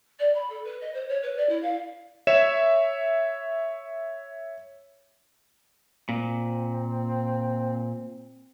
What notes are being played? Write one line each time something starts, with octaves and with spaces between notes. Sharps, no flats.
D5
B5
A4
B4
D#5
C5
C#5
B4
D5
E4
F5
C#5 E5 E7
A#2 C4